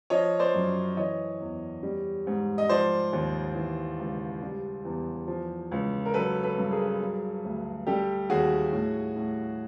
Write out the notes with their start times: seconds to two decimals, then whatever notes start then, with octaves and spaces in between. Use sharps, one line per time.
0.10 F3 C#5 D#5
0.39 C5 D5
0.54 F#2
0.97 E3 C#5 D#5
1.40 E2
1.83 G3
2.27 G#2
2.58 D#5
2.69 F3 C5 D5
3.13 D#2
3.55 E3
3.99 C#2
4.43 G3
4.85 E2
5.28 F3
5.72 C#2
6.06 A#4
6.14 F#3 A4 B4
6.43 A4 B4
6.58 G2
6.71 G#4 A#4
7.00 F#3
7.44 D2
7.87 G3 G4 A4
8.30 D#2 F#4 G#4
8.73 A2
9.16 A2